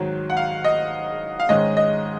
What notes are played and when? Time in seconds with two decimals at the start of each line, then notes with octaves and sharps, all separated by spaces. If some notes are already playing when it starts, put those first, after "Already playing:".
Already playing: G#2 D#3 F#3
0.30 F#5
0.37 F5
0.64 D#5
1.40 F5
1.49 G#2 D#3 G#3 C#4 D#5
1.77 D#5